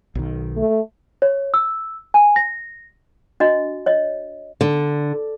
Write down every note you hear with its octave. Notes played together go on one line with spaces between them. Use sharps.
B1 D#3
A3
C#5
E6
G#5
A#6
D4 F#4 D#5
C#5 D#5
D3